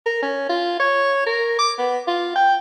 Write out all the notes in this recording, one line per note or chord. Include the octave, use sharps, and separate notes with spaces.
A#4
C#4
F4
C#5
A#4
D6
B3
F4
G5